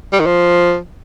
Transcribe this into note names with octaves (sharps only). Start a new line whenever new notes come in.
G3
D#3
F3